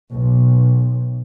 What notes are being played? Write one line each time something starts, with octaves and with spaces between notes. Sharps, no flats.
B1